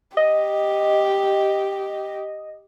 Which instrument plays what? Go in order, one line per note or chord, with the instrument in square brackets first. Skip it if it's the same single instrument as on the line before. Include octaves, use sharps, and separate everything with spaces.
[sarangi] G4 [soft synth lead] D#5